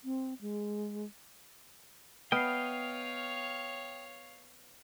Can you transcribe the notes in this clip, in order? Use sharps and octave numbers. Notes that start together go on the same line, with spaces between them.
C4
G#3
B3 C#5 D#5 F5 G5 F6 C7